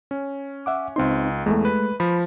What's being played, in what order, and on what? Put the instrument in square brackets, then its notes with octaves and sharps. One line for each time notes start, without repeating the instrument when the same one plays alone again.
[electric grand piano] C#4
[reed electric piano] E5 F#5 D6
[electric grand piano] C#2 C6 [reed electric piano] C4 D#4
[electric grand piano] E2 [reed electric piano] G#3 A3
[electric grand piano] B4
[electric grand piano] F3 [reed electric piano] B5